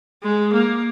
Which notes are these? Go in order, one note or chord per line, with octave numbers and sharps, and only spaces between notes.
G#3
A#3